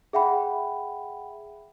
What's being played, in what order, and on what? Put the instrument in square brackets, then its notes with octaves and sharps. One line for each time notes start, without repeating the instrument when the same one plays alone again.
[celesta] G#4 E5 F#5 G5 B5